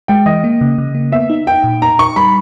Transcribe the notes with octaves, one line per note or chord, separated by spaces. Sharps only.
G#3 G5
E3 D#5
A#3
C#3
C#3
A#3
B3 E5
D#4
D#4 G5
A#2
D#4 A#5
D#4 C#6
G3 B5